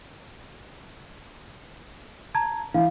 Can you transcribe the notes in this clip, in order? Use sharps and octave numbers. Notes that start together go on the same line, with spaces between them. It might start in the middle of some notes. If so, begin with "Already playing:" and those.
A5 A#5 G#6
E3 F5